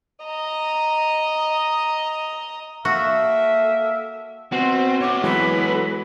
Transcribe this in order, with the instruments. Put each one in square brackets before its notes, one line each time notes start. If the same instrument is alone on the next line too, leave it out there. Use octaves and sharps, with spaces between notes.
[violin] D#5 A#5
[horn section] A#3 A4 E5 [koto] F#4
[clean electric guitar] B3 F#4 [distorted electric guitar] C4 [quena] C5
[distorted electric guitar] A4 C#5 [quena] D6
[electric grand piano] E3 F#3 G#3 [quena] B4